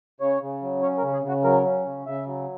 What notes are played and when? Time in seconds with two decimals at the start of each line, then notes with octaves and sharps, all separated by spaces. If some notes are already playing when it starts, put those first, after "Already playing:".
0.20 C#3 C#5
0.41 C#3
0.62 F#3
0.82 C#4 C#5
0.98 A#4
1.02 C#3
1.13 G#4
1.24 C#3 F#4
1.44 F#3 A#4
1.64 C#4
1.85 C#3
2.06 C#3 E5
2.27 F#3